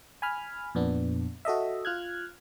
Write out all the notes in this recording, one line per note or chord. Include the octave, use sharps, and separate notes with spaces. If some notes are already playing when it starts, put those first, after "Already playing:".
G#5 B5 F6
F2 A#2 B3 D4
F#4 A4 D#5 E5
F4 F6 F#6 G#6